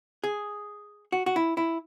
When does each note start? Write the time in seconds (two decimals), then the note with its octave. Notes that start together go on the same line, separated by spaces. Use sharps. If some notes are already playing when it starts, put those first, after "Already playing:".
0.24 G#4
1.12 F#4
1.26 F#4
1.36 E4
1.57 E4